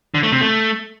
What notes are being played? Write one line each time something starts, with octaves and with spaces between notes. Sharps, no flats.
D3
A3
C3
A3